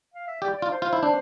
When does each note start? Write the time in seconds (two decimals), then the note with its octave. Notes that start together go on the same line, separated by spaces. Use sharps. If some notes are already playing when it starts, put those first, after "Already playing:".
0.14 F5
0.28 E5
0.42 G4 D5
0.58 F4 D5
0.71 C5
0.82 F4 C5
0.93 E4
1.02 D4 C5